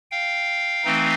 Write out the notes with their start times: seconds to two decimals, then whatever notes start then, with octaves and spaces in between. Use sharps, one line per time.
0.11 F5 G5
0.84 E3 A3 C4 D#4